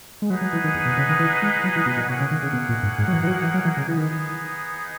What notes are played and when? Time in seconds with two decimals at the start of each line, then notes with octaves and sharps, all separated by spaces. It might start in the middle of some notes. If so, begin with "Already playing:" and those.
0.22 G#3
0.30 F#3 D#4 G#4 B4 D#5 F#5
0.41 F#3
0.53 E3
0.64 D#3
0.75 E2
0.86 B2
0.98 C#3
1.09 D#3
1.19 E3
1.42 G#3
1.64 F#3
1.76 E3
1.86 B2
1.97 A#2
2.08 B2 A#3 D#4 G#4 C#5 F#5
2.20 C#3
2.31 D#3
2.43 C#3
2.53 B2
2.69 A#2
2.83 G#2
2.98 G#2
3.08 F#3
3.13 E3
3.23 E3
3.27 F#3
3.43 E3
3.54 F#3
3.65 E3
3.77 C#3
3.88 E3 B3 D#4 G#4
3.98 D#3